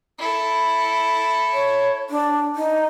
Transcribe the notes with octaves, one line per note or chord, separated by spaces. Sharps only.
E4 A4
C#5
D4
D#4